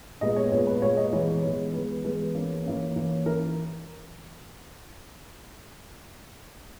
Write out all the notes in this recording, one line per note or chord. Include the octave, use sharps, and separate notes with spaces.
A#2 G#3 B3 D#5
C#5
A#2 G#3 B3 C#5
B4
A#2 G#3 B3 C#5
D#5
E3 G#3 B3 C#5
C#5
E3 G#3 B3 C#5
E3 G#3 B3 B4
E3 G#3 B3 B4
E3 A#3 C#4
E3 A#3 C#4
E3 A#3 C#4
E3 A#4